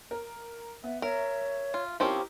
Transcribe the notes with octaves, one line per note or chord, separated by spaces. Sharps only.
A#4
B3 E5
A#4 C#5 E5
F4
F3 C4 C#4 D#4 E4 G4 A#4